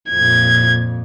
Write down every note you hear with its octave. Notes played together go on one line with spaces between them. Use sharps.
F2 A#2 G#6